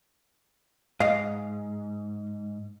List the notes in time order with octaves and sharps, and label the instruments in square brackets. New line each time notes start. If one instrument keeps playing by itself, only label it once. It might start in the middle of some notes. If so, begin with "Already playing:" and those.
[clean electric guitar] G#2 [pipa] D#5 F5